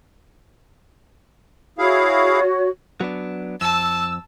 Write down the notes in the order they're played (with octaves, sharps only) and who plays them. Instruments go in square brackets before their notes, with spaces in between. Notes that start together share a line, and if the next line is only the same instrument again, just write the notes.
[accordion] E4 G#4 F5 [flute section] F#4 C#5
[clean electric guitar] F#3 B3 D4
[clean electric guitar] F2 [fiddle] A5 [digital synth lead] E6